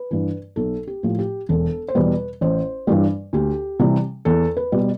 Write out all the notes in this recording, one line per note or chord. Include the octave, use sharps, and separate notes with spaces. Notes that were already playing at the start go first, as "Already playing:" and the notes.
Already playing: B4
G2 E3
B1 A4
G4
A2 F3
G4
E1 A4
C5
E2 B2 G3 B4
A1 C5
G2 E3 G3
D2 G4
C3 E3 G3
E2 A4
B4
B2 G3